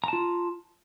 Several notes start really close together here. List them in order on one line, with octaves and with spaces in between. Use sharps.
A#5 A5 F4